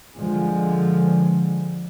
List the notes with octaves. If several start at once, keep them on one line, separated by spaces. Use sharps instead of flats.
D3 F3 G#3